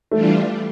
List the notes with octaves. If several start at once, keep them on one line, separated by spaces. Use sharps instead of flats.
E3 G3 A3 D4 F4